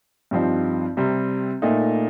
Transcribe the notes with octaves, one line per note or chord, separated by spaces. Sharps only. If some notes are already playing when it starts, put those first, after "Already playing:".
G2 F3 C4 D#4
C3 G3 C4
A#2 A3 D#4